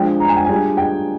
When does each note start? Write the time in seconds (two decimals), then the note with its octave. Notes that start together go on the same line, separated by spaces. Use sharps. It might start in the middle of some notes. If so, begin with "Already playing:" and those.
Already playing: F3 G#3 D4 G5
0.20 A#5
0.28 G#5
0.36 G5
0.45 G3 D4 F4 G#4 G#5
0.77 G5